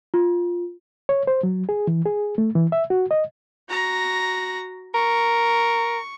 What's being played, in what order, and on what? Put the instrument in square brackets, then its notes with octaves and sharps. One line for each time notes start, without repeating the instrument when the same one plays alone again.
[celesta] F4
[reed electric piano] C#5
C5
F#3
G#4
E3
G#4
A3
E3
E5
F#4
D#5
[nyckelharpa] F#4 A#5
[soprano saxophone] A#4 [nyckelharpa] C#6